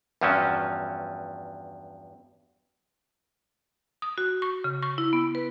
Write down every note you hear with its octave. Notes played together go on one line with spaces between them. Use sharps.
E2 G2 F3 F#3 C#4
D#6
F#4
C#6
C#3
C#6
E4
B3
B4